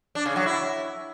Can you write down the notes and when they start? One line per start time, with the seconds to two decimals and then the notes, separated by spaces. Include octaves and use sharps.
0.15 D4
0.26 C#3
0.36 F#3
0.46 E4